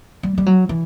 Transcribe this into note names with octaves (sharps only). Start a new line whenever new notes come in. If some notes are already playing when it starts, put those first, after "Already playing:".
G3
G3
F#3
E3